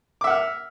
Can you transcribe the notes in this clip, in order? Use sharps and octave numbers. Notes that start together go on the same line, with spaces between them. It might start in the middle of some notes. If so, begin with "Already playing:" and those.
E5 F#5 D6 F6